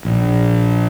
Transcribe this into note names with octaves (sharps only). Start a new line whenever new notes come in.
A#1